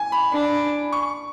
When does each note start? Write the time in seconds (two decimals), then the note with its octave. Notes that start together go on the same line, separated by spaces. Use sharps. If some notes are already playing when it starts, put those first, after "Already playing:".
Already playing: G#5
0.12 B5
0.32 D4
0.93 C#6